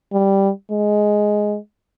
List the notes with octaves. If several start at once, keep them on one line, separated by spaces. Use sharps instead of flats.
G3
G#3